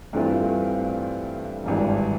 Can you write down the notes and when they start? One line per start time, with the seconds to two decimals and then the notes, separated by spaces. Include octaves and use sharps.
0.13 G2 E3 A3 C4 F4
1.64 G#1 G2 E3